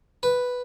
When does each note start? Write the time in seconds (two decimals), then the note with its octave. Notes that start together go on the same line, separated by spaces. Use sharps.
0.23 B4